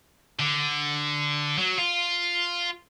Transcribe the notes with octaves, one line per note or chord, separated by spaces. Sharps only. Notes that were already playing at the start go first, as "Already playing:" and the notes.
D3
F#3
F4